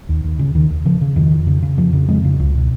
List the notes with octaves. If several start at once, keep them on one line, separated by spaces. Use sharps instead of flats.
D#2
D#2
C#3
D#2 D#3
D#2
C#3 F3
C#3
F2 D#3
F2
C#3
C#3
F2 F3
C#3
F2 G#3
C#3
C#2
B2